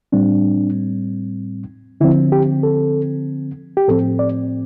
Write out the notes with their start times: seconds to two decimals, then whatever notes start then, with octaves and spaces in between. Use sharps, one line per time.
0.12 A2 G3 C4 D4
2.01 D3 F3 C4 E4
2.32 G4
2.63 A4
3.77 G4
3.88 A2 F3 C4 A4
4.19 D5